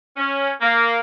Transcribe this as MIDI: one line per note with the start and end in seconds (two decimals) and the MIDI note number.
0.17 0.51 61
0.61 0.99 58